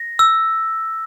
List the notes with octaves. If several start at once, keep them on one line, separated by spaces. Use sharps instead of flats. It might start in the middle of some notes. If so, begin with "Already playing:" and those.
Already playing: A#6
E6